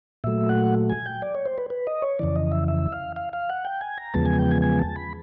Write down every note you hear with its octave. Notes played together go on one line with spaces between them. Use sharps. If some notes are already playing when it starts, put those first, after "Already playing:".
A#2 F#3 A3 E5
F#5
G#5
G5
D5
C#5
C5
B4
B4
D#5
C#5
F2 C#3 E3 D5
D#5
E5
E5
F5
F5
F5
F#5
G5
G#5
A#5
E2 C#3 F3 G#3 B3 A5
G#5
G5
G#5
G#5
A5
B5